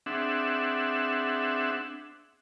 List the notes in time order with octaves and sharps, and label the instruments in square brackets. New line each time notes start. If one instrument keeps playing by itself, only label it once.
[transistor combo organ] C4 D4 G#4 E5 F#5